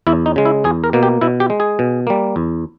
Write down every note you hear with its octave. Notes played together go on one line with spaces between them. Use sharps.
E2 E4
D#4
C#3 G#3
E4
E2 G#4
A#4
B2 A#3
G4
B2 E4
G4
G#3
G#4
B2
G3 A#3
E2